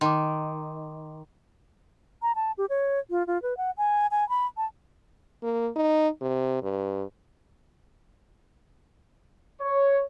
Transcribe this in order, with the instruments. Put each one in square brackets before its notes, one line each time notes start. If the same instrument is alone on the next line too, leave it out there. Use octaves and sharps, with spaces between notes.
[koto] D#3 [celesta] C6 D6
[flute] A#5
A5
G4
C#5
F4
F4
B4
F#5
G#5
G#5
B5
A5
[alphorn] A#3
D#4
C3
G2
[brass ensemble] C#5